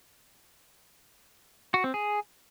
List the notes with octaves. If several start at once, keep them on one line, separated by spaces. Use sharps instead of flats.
F#4
C4
G#4